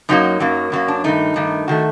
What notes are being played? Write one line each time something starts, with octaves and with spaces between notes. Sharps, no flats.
F#2 F#3 A#3 D#4
F#2 F#3 A#3
F#2 F#3 A#3
D4
G2 D#3 A3 D#4
G2 D#3 A3
D#3 A3 F#4